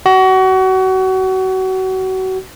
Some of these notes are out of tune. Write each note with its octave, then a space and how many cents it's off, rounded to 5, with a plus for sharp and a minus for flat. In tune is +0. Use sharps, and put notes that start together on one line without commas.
F#4 +30